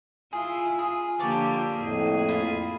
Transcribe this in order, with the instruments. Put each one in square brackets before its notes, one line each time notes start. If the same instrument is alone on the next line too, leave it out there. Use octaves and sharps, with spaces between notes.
[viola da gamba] E4 F4 [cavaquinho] G#4
[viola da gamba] F4 [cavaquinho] G#4
[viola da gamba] D3 A#3 G4 [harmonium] F3 [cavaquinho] C#5 D5 A5
[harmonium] F2 A2 [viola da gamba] A#3 G#4
[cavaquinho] E4 F4